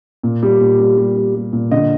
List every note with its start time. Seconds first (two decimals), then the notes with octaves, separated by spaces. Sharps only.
0.23 A#2
0.43 G3
0.60 A#2
0.79 G3
0.98 G3
1.16 G3
1.35 G3
1.53 A#2
1.71 D3 D#5